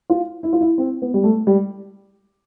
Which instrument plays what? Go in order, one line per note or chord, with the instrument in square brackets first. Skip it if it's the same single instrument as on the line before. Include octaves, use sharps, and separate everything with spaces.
[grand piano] F4
E4
F4
E4
C4
B3
G3
A3
G3